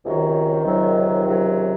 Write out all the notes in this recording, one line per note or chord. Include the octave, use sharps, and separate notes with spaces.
C#2 C3 D#3 F#3
C#2 C3 D#3 F#3
C#2 C3 D#3 F#3